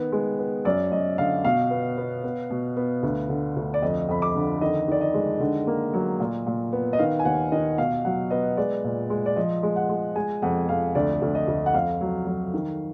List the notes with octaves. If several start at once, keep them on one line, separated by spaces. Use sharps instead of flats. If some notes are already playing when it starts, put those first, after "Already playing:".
Already playing: D#3 B3
G#3
B3
F#2 D5
F#2 D#5
D3 F5
B2 F5
B3
B3
B3
B2
B3
D2
D3
D2
D5
F2 D#5
F2 B5
D6
D3
D#3 D#5
D#3 D5
D#5
G#3
D3
A#3
F#3
A#2
A#2
B3
D#5
D#3 F5
G#5
D#2 F#5
D#3 D#5
B2 F5
F#3 F#5
B3 D#5
G#3 D5
A#2
G#3
D5
F3 D#5
G#3
F#5
G#3
G#3 G#5
F2 F#5
F2 F5
D2 D5
D2
D#5
D2
F#5
F2 F5
F#3
F#3
D#3